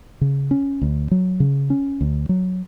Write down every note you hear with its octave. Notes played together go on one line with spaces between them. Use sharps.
C#3
C#4
D2
F#3
C#3
C#4
D2
F#3